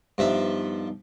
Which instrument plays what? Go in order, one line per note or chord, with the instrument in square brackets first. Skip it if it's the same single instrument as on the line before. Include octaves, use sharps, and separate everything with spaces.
[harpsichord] G2 F3 E5 [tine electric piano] G3 B3 D#4